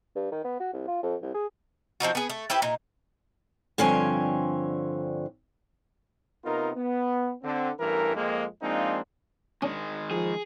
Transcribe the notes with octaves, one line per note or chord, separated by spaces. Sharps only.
G2
D#3
B3
F#4
C2
F4
F2
C2
G#4
F3 C4 D#4 F#4
B3 G#4
A3
E4 G4 B4 C5
A#2 D#4
G2 D3 F3 C4 C#5 G#5
C3 B3 D#4 F4 A#4
B3
D3 C4
A1 G2 E3 A#4
F2 G#3 A#3
F3 G#3 A#3 C4 D4 D#4
D#3 G#3 C#4 D4
F3 G#4